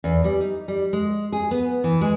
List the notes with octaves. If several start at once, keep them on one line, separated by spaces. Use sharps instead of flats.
E2
G3
D#4
G3
G#3
G#4
B3
E3
G#3